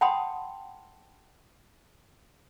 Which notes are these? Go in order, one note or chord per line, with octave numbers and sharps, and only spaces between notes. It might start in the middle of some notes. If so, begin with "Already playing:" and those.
F#5 G5 A5 B5 C6 D#6